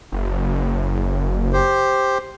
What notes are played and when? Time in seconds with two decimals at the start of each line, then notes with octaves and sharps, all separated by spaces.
0.12 F#1
1.53 G4 C5